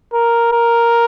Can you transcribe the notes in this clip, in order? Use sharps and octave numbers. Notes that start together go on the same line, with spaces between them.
A#4
A#4